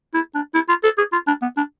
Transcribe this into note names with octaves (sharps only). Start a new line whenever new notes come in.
E4
D4
E4
F4
A4
G#4
F4
D4
B3
D4